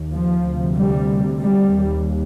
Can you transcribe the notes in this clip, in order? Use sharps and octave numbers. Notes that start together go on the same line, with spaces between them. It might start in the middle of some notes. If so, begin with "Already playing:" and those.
Already playing: D#2
F3
D2 C3
G3
G3
D#2